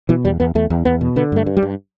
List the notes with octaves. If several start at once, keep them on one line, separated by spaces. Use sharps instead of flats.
B2 E3
E2 G3
E2 B3
E2 A3
E2
E2 B3
B2
D3 B3
G2 A3
G2
G3
G2